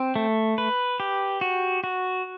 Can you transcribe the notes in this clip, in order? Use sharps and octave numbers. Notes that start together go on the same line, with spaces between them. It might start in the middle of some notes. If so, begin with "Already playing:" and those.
Already playing: C4
A3
B4
G4
F#4
F#4